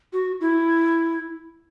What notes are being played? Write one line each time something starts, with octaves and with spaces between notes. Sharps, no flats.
F#4
E4